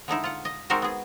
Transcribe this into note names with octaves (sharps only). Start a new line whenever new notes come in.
D3 G#3 D#4 E4
F4 F#5
D#5
G#3 C4 D#4 F#4 A#4 C5
B3 G#4